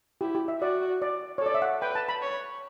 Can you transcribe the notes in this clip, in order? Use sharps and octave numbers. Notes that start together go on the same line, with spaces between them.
E4 G4
G4
E5
F#4 D5
D5
C#5
A4 D5
E5
F#5
B4 G5
A5
B5
C#5